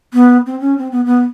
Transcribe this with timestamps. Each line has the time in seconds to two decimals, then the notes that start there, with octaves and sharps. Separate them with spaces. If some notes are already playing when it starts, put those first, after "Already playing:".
0.14 B3
0.46 C4
0.60 C#4
0.78 C4
0.91 B3
1.05 B3